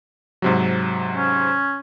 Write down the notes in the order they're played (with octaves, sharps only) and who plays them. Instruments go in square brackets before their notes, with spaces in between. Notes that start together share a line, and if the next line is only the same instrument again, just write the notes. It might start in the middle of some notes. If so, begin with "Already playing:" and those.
[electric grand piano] G#2 C3 F#3
[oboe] C#4